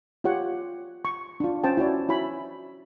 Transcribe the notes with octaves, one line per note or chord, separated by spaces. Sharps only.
F4 G4 C#5 F#5
C#6
D4 F4
C#4 C5 G5 A5
E4 F#4 C#5 D5
E4 F#4 C#5 G#5 B5